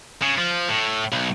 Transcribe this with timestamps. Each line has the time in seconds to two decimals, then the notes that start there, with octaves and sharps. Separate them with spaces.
0.22 C#3
0.38 F3
0.68 A2
1.12 B1